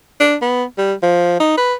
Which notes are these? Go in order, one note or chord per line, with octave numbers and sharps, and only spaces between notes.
D4
B3
G3
F3
D#4
B4